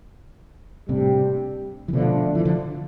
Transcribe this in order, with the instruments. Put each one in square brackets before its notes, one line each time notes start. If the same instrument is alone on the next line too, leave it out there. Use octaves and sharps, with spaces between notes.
[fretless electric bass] A2 C3 [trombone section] G3 D4 G4
[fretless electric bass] E3
[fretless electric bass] B2 D3 [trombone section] F3 A3 D4 F4
[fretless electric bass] E3
D3 F3